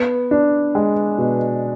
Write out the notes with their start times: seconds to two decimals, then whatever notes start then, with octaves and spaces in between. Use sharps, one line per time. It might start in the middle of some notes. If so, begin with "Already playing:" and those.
Already playing: B3
0.31 D4
0.75 G#3
1.18 B2